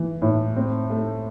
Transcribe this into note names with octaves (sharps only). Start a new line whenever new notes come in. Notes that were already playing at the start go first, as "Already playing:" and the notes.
Already playing: E3
A2
C4
A3